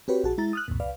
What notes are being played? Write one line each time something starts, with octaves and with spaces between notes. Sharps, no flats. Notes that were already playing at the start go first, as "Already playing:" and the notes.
C4 F#4 G4 B4 C#5
A#1 F#4 G#4 A5
G#3 E4 A#5 A6
D#6 F6 F#6
C2 F2 A#2
C2 B4 D5 F5